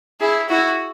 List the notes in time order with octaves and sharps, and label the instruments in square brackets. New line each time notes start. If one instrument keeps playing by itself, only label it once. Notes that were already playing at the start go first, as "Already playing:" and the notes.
[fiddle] E4 [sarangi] G#4
[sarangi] E4 [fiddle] F#4